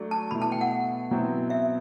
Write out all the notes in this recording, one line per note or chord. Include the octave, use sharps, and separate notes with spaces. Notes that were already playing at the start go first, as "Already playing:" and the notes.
Already playing: F#3 A3 D4
A5
B2 A3 E4 B5
A5
G5
F#5
B2 F#3 C4 E4
E5